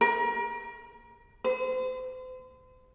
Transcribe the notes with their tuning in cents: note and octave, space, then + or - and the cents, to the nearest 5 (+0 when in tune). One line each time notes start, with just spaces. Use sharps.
A#4 +30
C5 -40